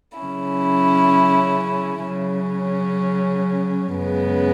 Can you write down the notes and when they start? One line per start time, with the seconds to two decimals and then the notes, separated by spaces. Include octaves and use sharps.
0.19 C#3 F#3 C#4 E4
2.08 C#3 F#3 C#4
3.97 F#2 C#3 G#3 B3